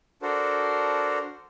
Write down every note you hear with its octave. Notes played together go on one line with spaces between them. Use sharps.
D4 F#4 A4 A#4 C5